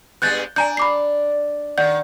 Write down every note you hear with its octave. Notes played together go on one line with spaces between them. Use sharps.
G2 G#3 B3 F#6 G6 A6
D4 G#5 A#5 G6
B5 D6 C7
D#3 D5 F#5 G6